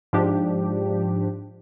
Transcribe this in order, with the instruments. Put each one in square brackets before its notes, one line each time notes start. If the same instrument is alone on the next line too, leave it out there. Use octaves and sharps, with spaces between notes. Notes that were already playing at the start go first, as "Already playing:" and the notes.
[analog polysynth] G#2 F3 D4 G4